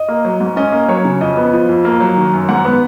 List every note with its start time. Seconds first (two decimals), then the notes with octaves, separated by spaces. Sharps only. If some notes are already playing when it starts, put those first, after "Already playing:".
Already playing: D#5
0.08 A#3
0.25 F#3
0.40 G#2
0.56 C#4 D#5
0.72 A#3
0.88 F#3 C#5
1.05 C#3
1.21 F2 D#5
1.37 B3
1.53 F3
1.69 F2
1.85 A#3
2.01 F#3
2.17 D#3
2.33 F#2
2.49 G#2 F#5
2.65 B3